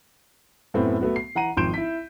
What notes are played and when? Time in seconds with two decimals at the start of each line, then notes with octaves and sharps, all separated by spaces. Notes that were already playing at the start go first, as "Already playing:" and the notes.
0.74 F#2 A2 F#3 A3 B3 C4
1.01 A3 B3 F#4
1.16 C7
1.35 E3 F#5 A#5 D#7
1.57 G#1 F3 C6 G6 D7 E7
1.74 E4 B6